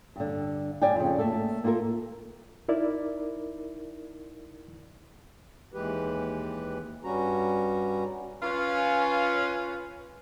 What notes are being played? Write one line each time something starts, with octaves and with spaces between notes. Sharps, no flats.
G2 D3
G2 D5 F5 G5 G#5
F2 C#3
A3 A#3 A4
A#3 F4 F#4 A4 A#4
D#4 E4 A#4 D5
D#2 E3 G#3 G4 B4
G2 G3 C#4 F#4 A#5
C#4 F4 B4